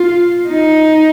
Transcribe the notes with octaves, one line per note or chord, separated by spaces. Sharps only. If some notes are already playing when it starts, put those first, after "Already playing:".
Already playing: F4
D#4